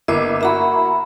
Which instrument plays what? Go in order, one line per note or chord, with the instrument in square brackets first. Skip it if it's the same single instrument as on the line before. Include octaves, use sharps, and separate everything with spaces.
[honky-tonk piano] G1 A#3 E4 [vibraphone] D#5 D6
[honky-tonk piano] A#3 E4 F#4 [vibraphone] E5 A#5 B5